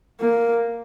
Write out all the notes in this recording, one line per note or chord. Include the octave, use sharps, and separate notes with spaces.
A#3